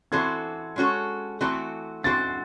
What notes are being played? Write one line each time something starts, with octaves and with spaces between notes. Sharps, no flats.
E3 C4 F#4 A4 C5 G#6
G#3 C#4 F#4 A4
E3 A3 C4 F#4 A4
E3 C4 F#4 C5 A6